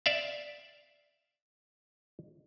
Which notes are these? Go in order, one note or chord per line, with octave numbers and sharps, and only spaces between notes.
D5 E5 F5